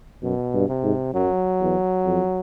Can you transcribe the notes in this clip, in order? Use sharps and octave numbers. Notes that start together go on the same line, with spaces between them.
F#2 B2
G2
C3
G#2
F#2 F#3
E2
F2